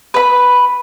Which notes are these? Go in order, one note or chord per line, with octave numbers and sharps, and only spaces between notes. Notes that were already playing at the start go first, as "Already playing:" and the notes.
B4 B5